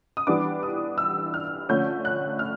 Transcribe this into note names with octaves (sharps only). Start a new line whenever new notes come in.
D#6
E3 G3 B3 D4 D6
D#6
E6
F6
D3 F3 A3 C#4 G6
F#6
F6